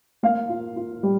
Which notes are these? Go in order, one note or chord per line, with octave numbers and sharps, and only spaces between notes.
A#3 F5
F4
F4
G3